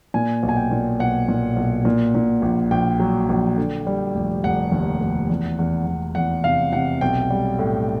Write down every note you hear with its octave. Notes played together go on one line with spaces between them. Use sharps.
A#2 G#5
B1
G#5
G5
A#2
B1 F#5
A#2
B1
A#2
A#2
A#1
A#1 G5
F#3
A#1
D3
G3
F1
F1 F#5
D#2
F1
E2
E2
E2
E2 F#5
C3 F5
C3 F#5
B1 G5
G3
A2